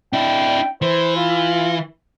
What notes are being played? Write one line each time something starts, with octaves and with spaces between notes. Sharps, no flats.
D4 E4 G5
E3 C5
F4